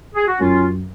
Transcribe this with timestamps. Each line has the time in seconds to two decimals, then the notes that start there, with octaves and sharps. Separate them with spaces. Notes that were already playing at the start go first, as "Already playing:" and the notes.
0.14 G#4
0.27 F#4
0.40 F#2 C#4 F4